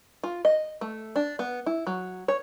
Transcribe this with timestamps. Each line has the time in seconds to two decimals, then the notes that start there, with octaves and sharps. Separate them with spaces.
0.24 F4
0.45 D#5
0.81 A3
1.16 D4
1.39 B3
1.66 E4
1.87 F#3
2.28 C#5